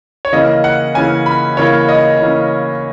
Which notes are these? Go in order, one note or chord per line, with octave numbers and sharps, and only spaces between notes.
C#5
C#3 E3 A#3 C#4 D#5
F#5
C#3 E3 A#3 C#4 G#5
B5
C#3 E3 A#3 C#4 C#5
D#5
C#3 E3 A#3 C#4